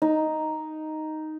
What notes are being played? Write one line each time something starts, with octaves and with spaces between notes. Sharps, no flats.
D#4